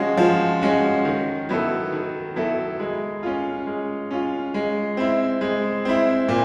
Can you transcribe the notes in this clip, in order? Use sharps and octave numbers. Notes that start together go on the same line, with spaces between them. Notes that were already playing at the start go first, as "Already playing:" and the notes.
Already playing: F3 G#3 C#4 F#4
F3
G#3 C#4 F#4
D#3
F#3 B3 E4 A4
D#3
F#3 B3 E4 A4
G#3
C#4 F4
G#3
C#4 F4
G#3
C4 E4
G#3
C4 E4
A#2